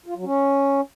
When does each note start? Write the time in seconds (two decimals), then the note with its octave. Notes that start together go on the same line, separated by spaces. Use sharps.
0.06 F4
0.16 F#3
0.25 C#4